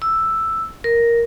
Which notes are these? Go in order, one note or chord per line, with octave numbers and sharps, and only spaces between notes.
E6
A#4